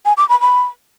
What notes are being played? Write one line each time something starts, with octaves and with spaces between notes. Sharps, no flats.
G#5
D6
B5
B5